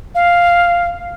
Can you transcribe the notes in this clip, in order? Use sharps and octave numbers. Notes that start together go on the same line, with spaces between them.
F5